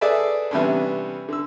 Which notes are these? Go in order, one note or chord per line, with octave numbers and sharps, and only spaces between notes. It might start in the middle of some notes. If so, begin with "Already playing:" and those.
G#4 A4 B4 D5 E5 A5
C3 E3 G3 B3 C#4 D4
D3 E6